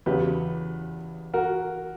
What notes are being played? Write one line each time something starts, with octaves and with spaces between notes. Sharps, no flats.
E2 C#3 F#3 G4 B4
F#4 A#4